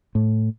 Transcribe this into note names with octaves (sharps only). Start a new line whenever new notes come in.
A2